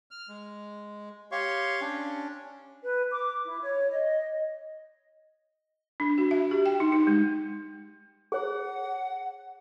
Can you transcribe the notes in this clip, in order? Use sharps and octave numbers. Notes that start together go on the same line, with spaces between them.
F6
G#3
G4 C#5 F5 C6 C#6
C#4 D4
B4
D6
E4
C#5
D#5
D4
F#4
E5
G4
G5
D#4
D#4
G#3
G#4 C#5 F#5